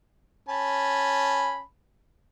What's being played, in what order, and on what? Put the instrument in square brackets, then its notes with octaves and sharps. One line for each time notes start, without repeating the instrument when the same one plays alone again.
[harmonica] C#4 A5 B5